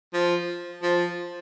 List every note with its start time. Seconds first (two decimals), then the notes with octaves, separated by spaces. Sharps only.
0.14 F3
0.83 F3